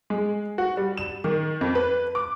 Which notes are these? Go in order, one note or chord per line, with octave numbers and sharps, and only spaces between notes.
G#3
F#4
G3
E7
D#3
F2
B4
D6